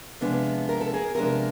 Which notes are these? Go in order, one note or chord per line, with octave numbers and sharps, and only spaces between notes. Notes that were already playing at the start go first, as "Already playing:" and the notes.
C3 F3 G#3 B3 D4
A#4
A4
G#4 A#4
C3 F3 G#3 B3 D4 G#4 A#4